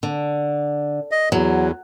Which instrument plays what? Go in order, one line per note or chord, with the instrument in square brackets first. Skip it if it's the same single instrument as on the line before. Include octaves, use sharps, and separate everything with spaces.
[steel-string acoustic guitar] D3
[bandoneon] D#5
[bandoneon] E2 [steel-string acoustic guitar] F#3